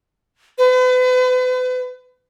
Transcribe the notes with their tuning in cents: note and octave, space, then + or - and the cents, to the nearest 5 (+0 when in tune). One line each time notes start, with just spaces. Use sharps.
B4 +40